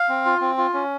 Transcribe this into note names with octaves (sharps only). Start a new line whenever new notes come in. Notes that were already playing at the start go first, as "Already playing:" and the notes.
Already playing: F5
C4
F4
C4
F4
C#4